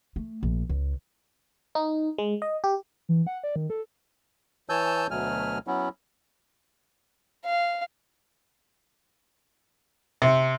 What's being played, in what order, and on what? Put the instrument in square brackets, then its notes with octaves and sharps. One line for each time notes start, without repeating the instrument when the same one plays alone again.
[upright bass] A3
A#1
C#2
[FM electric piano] D#4
G#3
D#5
G4
[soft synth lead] E3
F#5
D5
D#3
A4
[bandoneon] E3 C#5 G#5 A5 E6 G6
D2 B2 F#3 A3 G#5 F6
F#3 B3 C#4 E4
[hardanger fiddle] F5
[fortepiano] C3